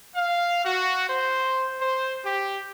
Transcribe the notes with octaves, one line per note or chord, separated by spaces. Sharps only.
F5
F#4
C5
C5
G4